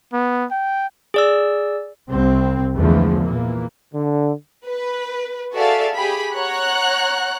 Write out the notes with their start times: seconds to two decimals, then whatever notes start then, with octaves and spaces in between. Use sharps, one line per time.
0.13 B3
0.52 G5
1.14 G#4 D5 E6
2.09 C2 C4
2.75 E2 D3 E3 F3 G#3 A3
3.22 A#2 E3 A#3
3.93 D3
4.66 B4
5.53 F#4 G#4 A4 D5 E5 F5
5.94 G4 G#4 B5
6.34 C#5 F#5 A#5 F#6